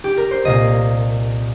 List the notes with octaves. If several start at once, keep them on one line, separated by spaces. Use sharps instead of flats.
G4
A#4
C5
C2 A#2 A#3 D#5